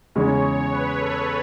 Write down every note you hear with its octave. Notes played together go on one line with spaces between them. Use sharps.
E2 C#3 G#3 C#4 C#5
B4
A4